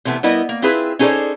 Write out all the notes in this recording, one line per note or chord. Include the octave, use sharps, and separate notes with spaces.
C3 E3 A3 B3
G3 B3 E4 A#4 D#5
A#3
C4 E4 F4 G#4 B4
C#4 D#4 G#4 A4 C5 D5